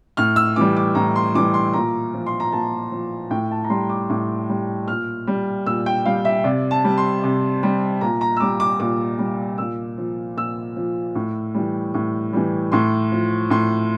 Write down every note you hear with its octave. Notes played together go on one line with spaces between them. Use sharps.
A2 F6
E6
E3 G3 D6
D6
A2 A#5
C6
E3 G3 D6
C6
A#2 A#5
F3
C6
A#5
A#2 A5
F3
A2 G5
A5
A#5
G3 C6
D6
A2 D6
G3
A#2 F6
G3
A#2 E6
G5
G3 F5
E5
C3 D5
A5
G3
C6
C3
G3
A#2 A#5
A#5
E6
G3 D6
D6
A#2 D6
G3
A#2 E6
F3
A#2 E6
F3
A2
E3 G3
A2
E3 G3
A2 C6
F3
A2 C6